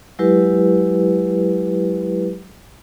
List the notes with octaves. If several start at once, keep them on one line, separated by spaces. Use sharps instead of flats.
F#3 G#3 E4 G4 B4